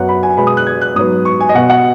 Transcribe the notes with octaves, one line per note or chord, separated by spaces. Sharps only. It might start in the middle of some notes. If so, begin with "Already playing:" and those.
Already playing: F#2 F#3 B3 F#5
B5
G#5
B2 G#3 B3 B5
D#6
F#6
G#6
F#6
G#2 F#3 B3 D#6
C#6
G#5
D#5
B2 B3 F#5
F#5